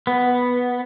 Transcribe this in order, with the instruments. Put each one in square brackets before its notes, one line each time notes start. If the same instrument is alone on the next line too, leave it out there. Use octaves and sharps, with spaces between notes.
[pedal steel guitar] B3